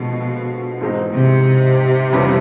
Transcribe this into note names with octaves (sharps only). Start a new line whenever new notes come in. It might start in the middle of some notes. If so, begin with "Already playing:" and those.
Already playing: B2 D3 F3 G#3
G#2 E3 G#3 C4 D#4
C3
F2 C#3 E3 G3 B3